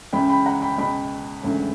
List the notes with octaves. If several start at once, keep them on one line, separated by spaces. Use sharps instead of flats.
C#2 C#3 E3 G5 B5
G5 B5
F#5 A#5
G5 B5
C#2 B2 G5 B5
E1 D2 C#3 E3